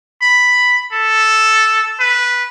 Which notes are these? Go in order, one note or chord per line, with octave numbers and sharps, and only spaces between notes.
B5
A4
B4